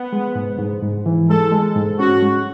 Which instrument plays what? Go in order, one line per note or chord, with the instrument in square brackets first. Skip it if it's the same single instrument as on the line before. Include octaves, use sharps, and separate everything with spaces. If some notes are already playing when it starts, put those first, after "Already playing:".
Already playing: [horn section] B3
[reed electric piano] G#3
G#2
G#2
G#2
E3
[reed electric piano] G#3 [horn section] A4
[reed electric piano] G#3
G#2
[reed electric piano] C#4 [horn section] F#4
[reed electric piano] G#3